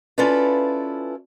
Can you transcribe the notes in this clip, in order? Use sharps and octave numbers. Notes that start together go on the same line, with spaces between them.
C#4 E4 F4 A4 B4 D5